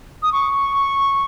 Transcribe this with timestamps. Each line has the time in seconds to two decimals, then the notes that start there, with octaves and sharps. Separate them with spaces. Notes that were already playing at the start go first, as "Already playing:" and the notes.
0.22 D#6
0.32 C#6